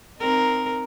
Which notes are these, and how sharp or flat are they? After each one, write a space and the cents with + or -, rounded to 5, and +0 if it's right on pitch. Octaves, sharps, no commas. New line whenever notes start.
C4 +0 D#4 +0 A#4 +0